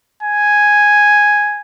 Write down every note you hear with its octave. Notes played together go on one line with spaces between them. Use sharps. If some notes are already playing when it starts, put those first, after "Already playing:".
G#5